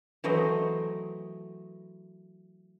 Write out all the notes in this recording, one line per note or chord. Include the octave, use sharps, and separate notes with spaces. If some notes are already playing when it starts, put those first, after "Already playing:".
E3 F#3 A3 C5 D#5